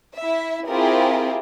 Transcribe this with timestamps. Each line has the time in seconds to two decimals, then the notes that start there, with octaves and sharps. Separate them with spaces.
0.18 E4 E5
0.68 C4 E4 F4 G4 G#4 A#4